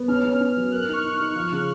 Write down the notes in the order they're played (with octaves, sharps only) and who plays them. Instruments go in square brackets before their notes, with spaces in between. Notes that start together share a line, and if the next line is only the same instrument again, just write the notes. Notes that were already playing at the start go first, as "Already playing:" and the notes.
Already playing: [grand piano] B3
[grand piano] C#4 [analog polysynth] F6
[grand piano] C#4
C#4
F#3
[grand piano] A#4 [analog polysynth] F#6
[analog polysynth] F6
[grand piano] D#4
[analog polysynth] C#6
[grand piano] D#4
D#4
F3
C#3